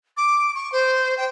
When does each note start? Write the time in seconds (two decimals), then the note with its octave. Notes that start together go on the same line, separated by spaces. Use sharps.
0.17 D6
0.55 C#6
0.72 C5
1.18 G5